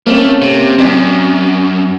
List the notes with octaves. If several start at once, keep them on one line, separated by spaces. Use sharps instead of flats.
A3 A#3 C4 C#4
C3
F#2 C4 D5 G#5